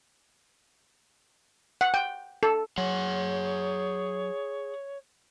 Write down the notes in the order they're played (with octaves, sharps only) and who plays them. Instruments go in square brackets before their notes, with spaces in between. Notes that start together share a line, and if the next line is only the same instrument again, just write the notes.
[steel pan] F#5
G5
A4
[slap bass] F#3 [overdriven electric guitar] G#4 F#5 [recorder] C#5